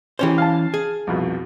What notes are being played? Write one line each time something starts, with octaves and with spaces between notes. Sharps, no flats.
E3 C#4 G4 C5 C#5
F5 A5
G#4
C2 F2 B2